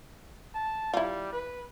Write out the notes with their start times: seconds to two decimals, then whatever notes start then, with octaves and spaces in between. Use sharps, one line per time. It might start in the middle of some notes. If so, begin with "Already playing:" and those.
0.55 A5
0.94 G3 E4 F4
1.32 B4